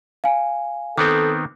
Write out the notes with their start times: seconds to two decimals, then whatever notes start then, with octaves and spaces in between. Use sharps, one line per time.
0.24 F5 G#5
0.98 D#3 B3 C4 A4 D6